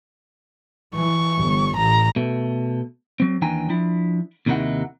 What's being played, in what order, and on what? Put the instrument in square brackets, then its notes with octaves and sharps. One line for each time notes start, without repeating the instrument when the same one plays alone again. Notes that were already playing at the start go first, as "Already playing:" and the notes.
[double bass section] E3 [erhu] C#6
[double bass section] G1
[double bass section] A1 [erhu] A#5
[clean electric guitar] B2 A3
F#3 C4
D#2 E3 D4 G5 G#5 A#5
F3 D4 E4
D#2 C3 D#3 D#4 E4 F#5